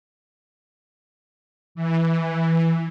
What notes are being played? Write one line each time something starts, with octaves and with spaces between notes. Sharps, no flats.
E3